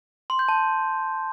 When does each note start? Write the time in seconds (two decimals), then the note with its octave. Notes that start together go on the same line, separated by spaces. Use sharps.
0.30 C6
0.39 G6
0.48 A5